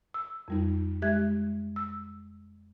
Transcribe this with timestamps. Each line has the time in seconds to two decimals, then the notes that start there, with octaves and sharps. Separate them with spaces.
0.14 E6
0.48 F2 G3 D#4
1.02 G#3 G4 E5 F#6 G#6
1.76 E6